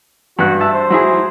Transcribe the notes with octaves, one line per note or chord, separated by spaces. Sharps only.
G2 F#4 F#6
E5 A5
C5
F#3 E4 G#4